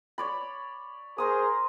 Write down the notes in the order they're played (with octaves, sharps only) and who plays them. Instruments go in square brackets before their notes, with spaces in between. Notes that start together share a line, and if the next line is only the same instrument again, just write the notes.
[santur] C#5 D5 B5
[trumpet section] G#4 A#4 C5 [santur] A#5 C6 D#6